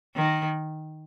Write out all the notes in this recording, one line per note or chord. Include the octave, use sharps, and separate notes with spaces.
D#3